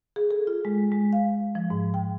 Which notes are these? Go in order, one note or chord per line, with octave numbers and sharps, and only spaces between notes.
G#4
A4
F4
G#3
G#3
F5
F3
G#2
G5